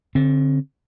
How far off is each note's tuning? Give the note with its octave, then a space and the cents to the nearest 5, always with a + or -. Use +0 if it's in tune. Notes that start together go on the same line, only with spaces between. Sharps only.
D3 -20 C4 +25